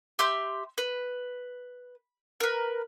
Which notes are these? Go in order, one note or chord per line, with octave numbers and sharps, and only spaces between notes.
G4 E5 C6 G6
B4
A#4 B4